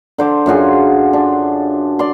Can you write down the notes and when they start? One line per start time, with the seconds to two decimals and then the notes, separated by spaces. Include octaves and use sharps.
0.18 D3 C5 D6
0.46 F#2 F4 F#4 G#4
1.13 D4
1.99 D5 C6